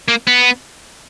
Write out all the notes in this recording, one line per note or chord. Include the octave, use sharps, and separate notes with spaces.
A#3
B3